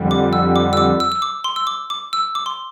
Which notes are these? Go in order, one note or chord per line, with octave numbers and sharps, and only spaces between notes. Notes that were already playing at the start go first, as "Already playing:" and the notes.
Already playing: F2 D3 G3
D6
E6
D6
E6
D6
E6
E6
D6
C6
E6
D6
D6
E6
D6
C6